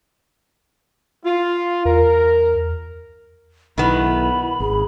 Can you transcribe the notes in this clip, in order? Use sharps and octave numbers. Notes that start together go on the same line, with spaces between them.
F4
E2 A#4
B1 D#3 B3 E4 B5
G#1 G#4